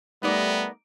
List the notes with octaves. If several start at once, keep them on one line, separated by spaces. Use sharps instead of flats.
G3 A3 B3 D#4 A#4 D5